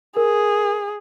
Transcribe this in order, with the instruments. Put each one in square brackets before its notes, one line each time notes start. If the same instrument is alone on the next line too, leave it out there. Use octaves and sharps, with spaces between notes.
[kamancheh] G#4 [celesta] A#4